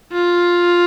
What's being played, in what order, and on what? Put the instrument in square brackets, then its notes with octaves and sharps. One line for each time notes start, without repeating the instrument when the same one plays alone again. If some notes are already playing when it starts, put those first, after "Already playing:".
[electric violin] F4